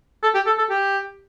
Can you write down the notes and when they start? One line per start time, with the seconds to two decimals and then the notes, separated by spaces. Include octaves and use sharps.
0.23 A4
0.35 G4
0.46 A4
0.58 A4
0.70 G4